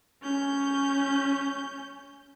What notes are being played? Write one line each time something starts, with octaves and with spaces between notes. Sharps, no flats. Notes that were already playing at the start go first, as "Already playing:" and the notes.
C#4 G6